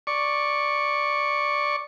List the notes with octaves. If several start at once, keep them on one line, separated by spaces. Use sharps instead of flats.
D5 C#6